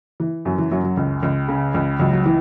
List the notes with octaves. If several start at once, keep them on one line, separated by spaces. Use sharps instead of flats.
E3
F#2 F#3
E3
F#2 F#3
F#3
C#2
C#2
C#3
C#2
C#2 F#3
F#3
E3